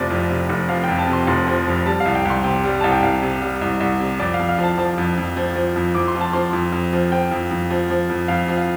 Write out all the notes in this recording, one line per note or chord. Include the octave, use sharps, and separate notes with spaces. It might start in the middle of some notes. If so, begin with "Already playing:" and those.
Already playing: F1 C3 F3 D5
F2
C3
F1
F3 F5
F2 G5
A5
C3
C6
F1 C6
F3
F2
G3 A5
F5
C2
G5
C2 C6
C3 G5
G3
C2 A5
G5
C2 F5
C3
G3
C2
C2
C3
F2 D5
F5
F2
F5
F3
A5
F3 A5
F2
F2
F3
F3
F2
F2 D6
C6
F3
A5
F3 C6
F2
F2
F3
F3 G5
F2
F2
F3
F3
F2
F2 F5
F3
F5